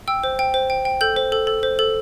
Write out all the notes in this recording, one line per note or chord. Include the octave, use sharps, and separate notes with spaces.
G5 E6
C5
G5
C5
G5
G5
A4 G6
C5
A4
A4
C5
A4